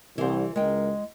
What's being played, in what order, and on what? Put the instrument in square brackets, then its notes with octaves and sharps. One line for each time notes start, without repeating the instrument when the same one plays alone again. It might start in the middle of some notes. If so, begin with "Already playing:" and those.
[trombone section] C2 [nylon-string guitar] E3 C5
[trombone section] C#2 A#4 [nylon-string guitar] G#3 G5